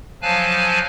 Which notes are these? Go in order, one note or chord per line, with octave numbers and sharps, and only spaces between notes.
F3 F#3 F5 G#5 A5 F#6